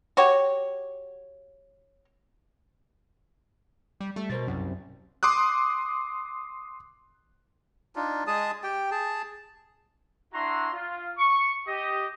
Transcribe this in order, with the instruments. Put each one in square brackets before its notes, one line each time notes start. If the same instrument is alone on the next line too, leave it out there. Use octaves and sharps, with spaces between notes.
[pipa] F#4 G4 C#5
[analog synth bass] G3
[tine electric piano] G3 [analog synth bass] A3
[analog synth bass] B2 [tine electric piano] A#4 C5 A6
[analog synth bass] C2 [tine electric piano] F#2
[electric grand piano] C6 D6 D#6 F#6
[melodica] D4 D#4 F4
G#3 G#4 A5 D#6
G4 G5
G#4 A5
[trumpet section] D4 E4 F#4 E5 A#5 C6
F4
C#6
G4 D#5